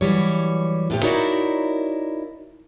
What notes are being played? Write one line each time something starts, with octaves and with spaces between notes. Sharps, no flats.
E3 F#3 G3 C#5
F#2 A2 C3 B3 G4 C#5
D#4 E4 F#4 A#4 C#5 D5